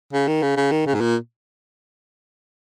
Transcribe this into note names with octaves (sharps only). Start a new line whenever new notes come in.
C#3
D#3
C#3
C#3
D#3
C#3
G#2
A#2